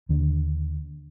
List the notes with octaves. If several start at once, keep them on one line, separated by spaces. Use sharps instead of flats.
D#2 D3